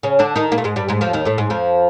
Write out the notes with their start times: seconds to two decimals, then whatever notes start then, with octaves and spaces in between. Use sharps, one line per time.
0.03 C#3 C#4
0.19 D3 D4
0.36 D#3 D#4
0.52 A#2 A#3
0.58 A3
0.64 G#2 G#3
0.76 G2 G3
0.88 G#2 G#3
1.01 F2 F3
1.13 D#2 D#3
1.25 A2 A3
1.38 G#2 G#3
1.50 F2 F3